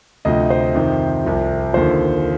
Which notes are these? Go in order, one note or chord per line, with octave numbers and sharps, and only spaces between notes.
D2 C3 F3 D#5
C5
F2 C3 D#3
C2 C3 F3
D#2 D3 F3 C5